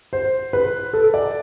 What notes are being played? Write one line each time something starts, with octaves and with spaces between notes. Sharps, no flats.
C5
B4
A4
D5